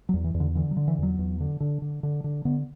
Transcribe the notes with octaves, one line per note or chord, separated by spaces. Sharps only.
F#3
E2
E3
E2
D3
D3 E3
F#3
D3
E3
E2 F#3
E2
D3
D3
D3
D3
D3
D3 B3